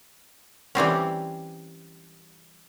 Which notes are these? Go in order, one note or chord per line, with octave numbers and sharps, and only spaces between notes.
E3 G3 C4 C#4